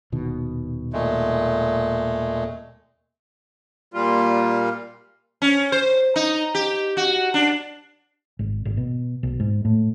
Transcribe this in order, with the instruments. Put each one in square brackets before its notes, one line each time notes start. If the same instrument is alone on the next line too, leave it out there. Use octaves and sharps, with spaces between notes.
[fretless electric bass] D#1 B2 D#3
[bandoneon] A#2 G#3 A3
[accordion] A#2 G3 F4
[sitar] C#4
C5
D#4
G4
F#4
D4
[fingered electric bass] G#1
G#1
B2
B1
G#2
A2